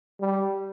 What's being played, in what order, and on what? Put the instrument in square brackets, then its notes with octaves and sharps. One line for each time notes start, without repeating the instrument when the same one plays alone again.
[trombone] G3